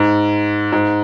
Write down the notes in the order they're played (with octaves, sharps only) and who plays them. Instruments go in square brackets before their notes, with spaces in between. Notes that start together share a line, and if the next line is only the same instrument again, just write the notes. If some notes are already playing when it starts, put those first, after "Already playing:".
Already playing: [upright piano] G#2
G#2